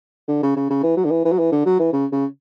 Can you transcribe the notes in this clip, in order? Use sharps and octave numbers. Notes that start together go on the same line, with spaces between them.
D3
C#3
C#3
C#3
E3
F#3
D3
E3
E3
F#3
E3
D3
F#3
E3
C#3
C#3